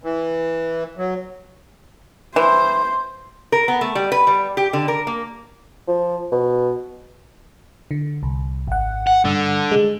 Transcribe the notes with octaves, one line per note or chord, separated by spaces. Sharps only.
E3
F#3
E3 C5
A#4
B3
A3
G3
B4
G3
G4
D3
A#4
A#3
F3
B2
D3
C2
G#1 F#5
F#5
G2 D3
G#3